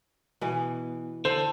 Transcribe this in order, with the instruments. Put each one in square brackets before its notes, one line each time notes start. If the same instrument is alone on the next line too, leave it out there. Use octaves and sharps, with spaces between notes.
[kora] B2 E3 [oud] B3
[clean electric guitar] D3 [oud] A4 [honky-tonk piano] C5